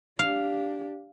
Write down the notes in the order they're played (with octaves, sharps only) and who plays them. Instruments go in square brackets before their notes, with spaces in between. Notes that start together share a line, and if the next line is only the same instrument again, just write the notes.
[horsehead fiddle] D4 G4 [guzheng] F5